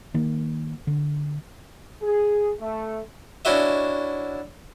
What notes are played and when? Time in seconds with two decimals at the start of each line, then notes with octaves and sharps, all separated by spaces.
0.14 D#3 A#3
0.87 D3
2.02 G#4
2.60 A3
3.45 C#4 D4 E4 F#4 D#5 E5